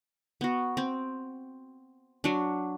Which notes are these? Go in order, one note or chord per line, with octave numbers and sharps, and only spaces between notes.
B3 F#4
C4
F#3 D4